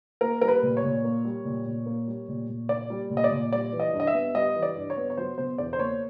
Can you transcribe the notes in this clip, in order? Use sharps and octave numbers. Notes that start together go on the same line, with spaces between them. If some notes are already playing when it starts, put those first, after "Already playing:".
A#3 A#4
G3 A#4
B4
A#2
C#5
A#2
A#3
G3
A#2
A#2
A#3
G3
A#2
A#2
A#3 D5
G3
A#2
D#5
D5
A#2
G3 D5
E3
D#5
G2
D#5
E5
B3
G3 D#5
E3
D5
G2
C#5
B3
C#5
F#3 C5
B2 C5
E2 D5
C5
A#3 C#5